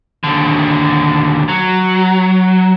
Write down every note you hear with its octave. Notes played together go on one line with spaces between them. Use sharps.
D#2 D3
F#3